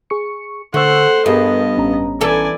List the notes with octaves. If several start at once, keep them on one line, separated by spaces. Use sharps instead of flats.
G#4 C#6 C#7
D3 A3 C5 F#5 C#6 E6
G2 B3 G4 G#4 A#4 D#5
A1 C#4 A#5
E3 A4 D5 G#5